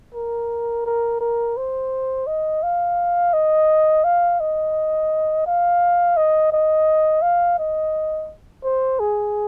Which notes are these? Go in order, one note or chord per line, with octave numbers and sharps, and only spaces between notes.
A#4
A#4
A#4
C5
D#5
F5
D#5
F5
D#5
F5
D#5
D#5
F5
D#5
C5
G#4